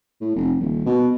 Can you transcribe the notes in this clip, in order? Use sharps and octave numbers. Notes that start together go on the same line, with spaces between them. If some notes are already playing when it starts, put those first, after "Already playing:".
A2
F1
D#1
B2